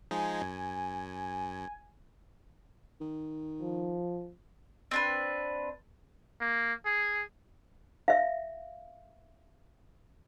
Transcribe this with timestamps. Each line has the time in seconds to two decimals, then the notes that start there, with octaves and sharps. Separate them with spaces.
0.11 F3 G#3 D#4 G#5
0.41 F#2
3.01 D#3
3.62 F3
4.91 C4 D4 B4
6.41 A#3
6.86 G#4
8.08 E5 F5